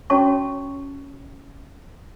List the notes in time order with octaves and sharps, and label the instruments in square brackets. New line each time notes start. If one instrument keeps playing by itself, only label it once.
[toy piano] C#4 F#4 C#5 A5 C#6